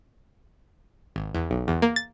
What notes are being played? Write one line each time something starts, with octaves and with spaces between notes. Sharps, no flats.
G#1
E2
B1
E2
A#3
A6